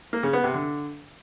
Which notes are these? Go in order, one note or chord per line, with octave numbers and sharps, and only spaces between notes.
A#3
C#3
B3
C3
D3